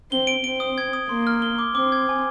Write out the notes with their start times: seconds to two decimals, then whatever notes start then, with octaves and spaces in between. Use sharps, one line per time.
0.11 C4 G7
0.27 D7
0.44 C4 D7
0.60 D#6
0.78 G#6
0.93 D#6
1.09 A#3 C6
1.27 F6
1.42 G7
1.58 D6
1.75 C4 D6
1.92 G#6
2.09 G#5